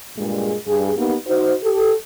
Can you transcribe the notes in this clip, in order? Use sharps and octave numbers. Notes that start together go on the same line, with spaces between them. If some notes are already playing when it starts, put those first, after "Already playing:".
G2 A#2 G#3
G2 G#4
A#3 B3 D#4 G4
D#4 F#4 C5
G4 A4